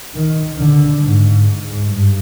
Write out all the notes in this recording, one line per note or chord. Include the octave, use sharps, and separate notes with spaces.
D#3
D3
G#2
G#2
G2